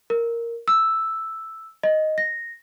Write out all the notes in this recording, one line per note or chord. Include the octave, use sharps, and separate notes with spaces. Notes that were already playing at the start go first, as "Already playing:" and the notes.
A#4
E6
D#5
A#6